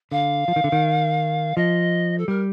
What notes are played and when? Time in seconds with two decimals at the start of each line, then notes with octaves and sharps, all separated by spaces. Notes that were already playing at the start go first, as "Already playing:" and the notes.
0.12 D3 F5
0.48 F3
0.56 D#3
0.64 D3
0.72 D#3
1.57 F3 D#5
2.18 A4
2.28 G3 A#4